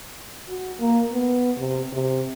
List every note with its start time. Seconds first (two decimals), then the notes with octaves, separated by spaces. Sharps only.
0.49 F#4
0.80 A#3
1.13 B3
1.58 C3
1.93 C3